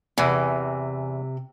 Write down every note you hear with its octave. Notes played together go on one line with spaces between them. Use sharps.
E2 C3 E3